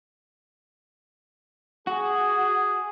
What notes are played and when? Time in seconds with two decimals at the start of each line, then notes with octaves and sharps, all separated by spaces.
1.87 F#4 G#4